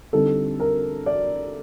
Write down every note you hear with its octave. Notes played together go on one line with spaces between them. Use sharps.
D3 G3 C4 D#4 A4
A#4
D5